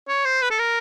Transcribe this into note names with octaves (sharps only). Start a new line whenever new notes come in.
C#5
C5
B4
A4
A#4